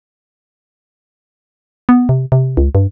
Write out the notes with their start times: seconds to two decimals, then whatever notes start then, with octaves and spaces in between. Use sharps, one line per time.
1.89 B3
2.09 C3
2.32 C3
2.57 C#2
2.75 G2